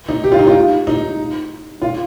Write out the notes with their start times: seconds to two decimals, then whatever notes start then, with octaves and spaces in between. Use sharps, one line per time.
0.09 D#4
0.24 G4
0.32 F4
0.39 D#4
0.47 F4
0.87 D#4
1.82 F4